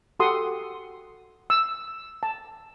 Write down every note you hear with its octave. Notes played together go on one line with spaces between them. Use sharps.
F#4 G4 A4 F#5 C6 D#6
E6
A5